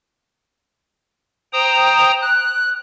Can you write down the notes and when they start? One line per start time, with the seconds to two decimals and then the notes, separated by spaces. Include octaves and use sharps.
1.53 C5 G5 A#5 D#6
2.22 F#6